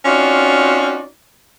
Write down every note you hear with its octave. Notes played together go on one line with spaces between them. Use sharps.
C4 C#4 D#4 F4 F#4 D5